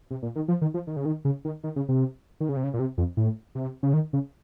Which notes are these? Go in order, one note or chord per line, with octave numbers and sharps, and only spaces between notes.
C3
A#2
D#3
F3
D#3
F3
D#3
C#3
D#3
C#3
D#3
D#3
C#3
C3
D#3
C#3
C3
C#3
A#2
C3
F2
A2
C3
C#3
D#3
C#3